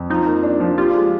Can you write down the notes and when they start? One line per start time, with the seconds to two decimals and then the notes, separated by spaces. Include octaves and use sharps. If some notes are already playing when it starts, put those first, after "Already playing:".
Already playing: F2
0.10 F3 D#4
0.26 A#3
0.43 D4
0.60 F3
0.78 F4 G4
0.95 G#3